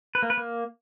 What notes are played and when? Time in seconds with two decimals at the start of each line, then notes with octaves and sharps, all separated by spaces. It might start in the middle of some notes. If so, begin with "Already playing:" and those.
0.15 B4
0.22 A#3
0.30 B4
0.38 A#3